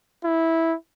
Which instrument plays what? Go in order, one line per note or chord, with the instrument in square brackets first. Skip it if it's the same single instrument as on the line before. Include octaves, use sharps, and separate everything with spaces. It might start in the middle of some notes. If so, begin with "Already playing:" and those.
[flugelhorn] E4